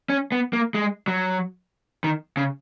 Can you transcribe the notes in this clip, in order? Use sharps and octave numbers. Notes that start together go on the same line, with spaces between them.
C#4
B3
A#3
G#3
F#3
D#3
C#3